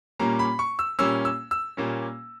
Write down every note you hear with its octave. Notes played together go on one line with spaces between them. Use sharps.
A#2 G3 A#3 C#4 A#5
B5
C#6
E6
A#2 G3 A#3 C#4 E6
E6
E6
A#2 G3 A#3 C#4